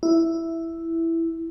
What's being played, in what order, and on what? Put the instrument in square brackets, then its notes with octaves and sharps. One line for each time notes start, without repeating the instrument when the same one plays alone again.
[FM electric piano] E4